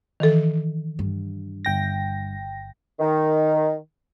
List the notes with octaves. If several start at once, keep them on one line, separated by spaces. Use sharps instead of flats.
D#3 E3 A4
G2
G1 G5 A#6
D#3